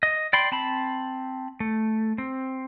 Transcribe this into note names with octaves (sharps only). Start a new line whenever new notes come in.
D#5
D5 G5 B5 C6
C4 A5 B5
A3
C4